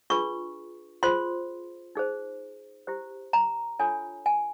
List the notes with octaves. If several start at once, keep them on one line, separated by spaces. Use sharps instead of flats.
D4 F4 G#4 B4 C#6
F4 G#4 C5 C6
D#4 G#4 C5
E4 G4 C5
A#5
D4 F4 A4 C#5 G#5
G#5